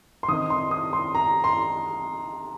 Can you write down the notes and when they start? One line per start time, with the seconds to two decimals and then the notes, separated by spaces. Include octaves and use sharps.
0.23 C6
0.28 D#3 C4 D#4 D#6
0.50 C6
0.71 D#6
0.93 C6
1.15 A#5
1.44 C6